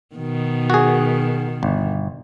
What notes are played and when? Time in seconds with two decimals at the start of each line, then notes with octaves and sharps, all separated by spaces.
0.15 B2 D#3
0.70 F#4 G#4
1.63 G1